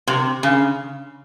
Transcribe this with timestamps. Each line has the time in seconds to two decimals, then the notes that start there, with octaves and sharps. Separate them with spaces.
0.07 C3
0.43 C#3